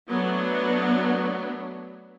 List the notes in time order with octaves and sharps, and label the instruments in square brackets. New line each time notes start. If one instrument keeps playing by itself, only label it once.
[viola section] F#3 A3 B3 D4